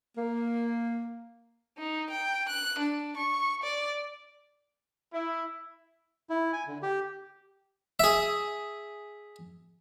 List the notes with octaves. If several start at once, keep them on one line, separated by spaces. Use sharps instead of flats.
A#3
D#4
G5
F#6
D4
C#6
D5
E4
E4
G#5
D3
G4
G#4 E5